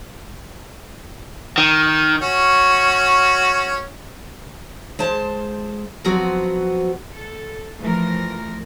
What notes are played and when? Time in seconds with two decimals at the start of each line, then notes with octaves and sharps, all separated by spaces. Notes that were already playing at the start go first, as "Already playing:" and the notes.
1.58 D#3
2.22 C#4 F#4
4.99 G#3 C5 A5
6.04 F3 F#3 B3 C4 F#4
7.14 A4
7.81 E3 F3 A3 A#4